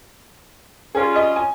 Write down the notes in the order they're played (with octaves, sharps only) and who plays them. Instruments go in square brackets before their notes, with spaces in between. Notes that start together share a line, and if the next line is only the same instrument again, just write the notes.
[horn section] G3 C#4 F4 [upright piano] G#4
[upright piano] D#5
G#5